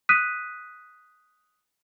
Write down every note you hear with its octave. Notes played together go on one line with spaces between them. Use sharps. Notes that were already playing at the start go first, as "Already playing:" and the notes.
D#6 F#6 B6 D#7